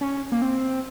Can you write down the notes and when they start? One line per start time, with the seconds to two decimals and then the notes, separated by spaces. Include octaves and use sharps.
0.01 C#4
0.32 A#3
0.42 C4